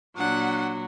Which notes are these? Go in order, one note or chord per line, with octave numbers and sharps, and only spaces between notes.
A#2 F#3 D4 F#5